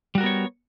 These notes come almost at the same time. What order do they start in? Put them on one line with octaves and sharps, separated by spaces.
G3 F#4 A#4 B3 C#5